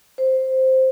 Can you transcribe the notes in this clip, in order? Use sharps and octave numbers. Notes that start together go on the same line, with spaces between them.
C5